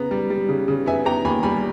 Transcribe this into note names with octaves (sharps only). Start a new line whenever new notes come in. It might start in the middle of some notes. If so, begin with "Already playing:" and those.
Already playing: C#3 B3 A#5
G3
G3
C#3
C#3
B3 E5 G#5
B3 G5 A#5
D#2 G#5 B5
G3 G#5 B5